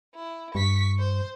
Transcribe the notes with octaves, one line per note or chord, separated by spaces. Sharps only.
E4
G2 C#6 B6
C5